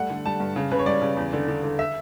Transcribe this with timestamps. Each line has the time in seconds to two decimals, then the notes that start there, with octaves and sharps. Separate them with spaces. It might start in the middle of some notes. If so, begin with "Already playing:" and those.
Already playing: G3 A3 F#5
0.10 D3
0.25 G3 A5
0.40 G2
0.56 C#3
0.71 C#3 B4
0.79 C#5
0.86 G3 D5
1.02 C#3
1.17 E2
1.33 D3
1.48 D3
1.64 D3
1.79 E5